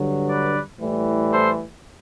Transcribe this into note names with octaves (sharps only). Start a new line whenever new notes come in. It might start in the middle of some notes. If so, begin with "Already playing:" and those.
Already playing: G2 D3 F#3
B4 D5
A2 E3 G3
A4 C5